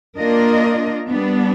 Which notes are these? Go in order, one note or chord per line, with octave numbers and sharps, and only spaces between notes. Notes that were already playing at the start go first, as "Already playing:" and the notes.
A#3 D4 F4 A#4 D#5
G3 B3 D4